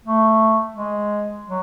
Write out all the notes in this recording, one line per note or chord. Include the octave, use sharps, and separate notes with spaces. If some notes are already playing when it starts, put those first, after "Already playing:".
A3
G#3
F#3